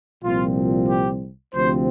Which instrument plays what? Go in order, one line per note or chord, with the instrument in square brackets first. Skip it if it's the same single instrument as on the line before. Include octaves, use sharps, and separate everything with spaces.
[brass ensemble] C2 A#2 F3 C4 F4
G4
D2 C3 F3 C4 C5